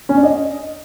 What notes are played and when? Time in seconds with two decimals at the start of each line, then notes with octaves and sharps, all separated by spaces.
0.09 C#4
0.16 D4
0.23 D#5